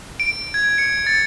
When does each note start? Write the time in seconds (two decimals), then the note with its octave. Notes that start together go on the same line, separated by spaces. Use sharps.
0.20 D7
0.54 G#6
0.78 C#7
1.07 A6